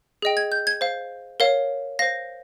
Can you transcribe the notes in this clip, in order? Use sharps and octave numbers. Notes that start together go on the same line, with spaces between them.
G#4 D#5 G5
G#6
G6
G#6
C5 F5
A#4 C#5 F5
C5 F5 A#6